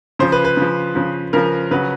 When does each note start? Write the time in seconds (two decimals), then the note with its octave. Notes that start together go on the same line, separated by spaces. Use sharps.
0.19 C#3 F3 C5
0.32 B4
0.45 B4
0.57 C#3 F3
0.95 C#3 F3
1.33 C#3 F3 A#4
1.71 C#3 F#3 B4